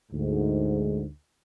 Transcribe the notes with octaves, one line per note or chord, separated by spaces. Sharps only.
D2 G#2